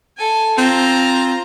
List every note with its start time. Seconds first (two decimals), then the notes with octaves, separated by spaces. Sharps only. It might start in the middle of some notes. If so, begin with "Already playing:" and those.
0.17 A4 G#5
0.58 C4 F4 A#5